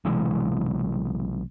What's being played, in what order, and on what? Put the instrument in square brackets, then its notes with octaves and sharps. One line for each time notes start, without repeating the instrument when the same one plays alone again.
[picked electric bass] B1 C3 E3 G#3